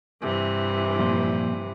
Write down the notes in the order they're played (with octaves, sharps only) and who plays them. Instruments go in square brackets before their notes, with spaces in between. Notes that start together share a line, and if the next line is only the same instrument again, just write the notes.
[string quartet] G2 C3 E3
[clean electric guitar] F2 A#2 C6